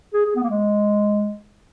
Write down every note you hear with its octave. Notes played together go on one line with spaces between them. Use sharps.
G#4
G#4
B3
A#3
G#3